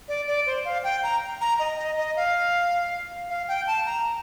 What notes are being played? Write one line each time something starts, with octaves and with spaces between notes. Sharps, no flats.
D5
D5
C5
F5
G5
A#5
A#5
D#5
D#5
D#5
F5
F5
G5
A5
A#5